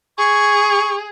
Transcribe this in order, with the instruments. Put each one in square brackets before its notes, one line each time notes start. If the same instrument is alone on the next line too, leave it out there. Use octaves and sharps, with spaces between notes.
[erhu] G#4 [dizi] C#6